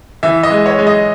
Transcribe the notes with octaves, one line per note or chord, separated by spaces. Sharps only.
E3 E5
D#5
G#3
C#5
G#3
D#5